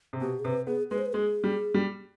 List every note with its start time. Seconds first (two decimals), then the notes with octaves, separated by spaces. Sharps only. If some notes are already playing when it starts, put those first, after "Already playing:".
0.13 C3
0.21 B2 G4
0.39 G#4
0.45 C3 B4
0.67 B3 G#4
0.90 G#3 B4
0.98 C5
1.06 B4
1.13 G#3 G#4
1.44 G3
1.74 G3